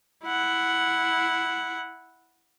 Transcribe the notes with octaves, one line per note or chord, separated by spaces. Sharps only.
E4 F#5